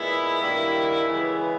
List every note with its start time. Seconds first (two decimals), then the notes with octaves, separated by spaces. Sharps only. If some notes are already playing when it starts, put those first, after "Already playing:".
Already playing: A#2 G#3 B3 E4
0.39 G2 D#3 G3 A#3
1.06 C#3 E3 G#3 B3